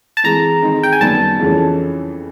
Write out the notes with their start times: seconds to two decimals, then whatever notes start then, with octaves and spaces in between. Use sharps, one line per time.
0.17 A5
0.24 E3 G#3 C4 A#5
0.63 D#3 G#3 C4 D#4
0.83 G5
0.93 G#5
1.01 F#2 D#3 G3 B3 A5
1.39 F2 C#3 E3 A3 C#4